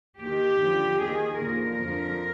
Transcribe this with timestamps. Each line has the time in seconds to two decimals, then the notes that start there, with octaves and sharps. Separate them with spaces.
0.19 D#2 D#3 G4
0.60 F2 D3 F3
0.99 D#2 D#3 G#4
1.40 D#2 D3 F3 A#4
1.81 F2 D3 F3